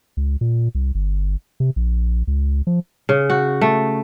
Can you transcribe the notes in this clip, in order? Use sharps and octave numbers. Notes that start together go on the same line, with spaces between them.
C#2
A#2
C2
G1
C3
A#1
C#2
F3
C#3
F#4
A3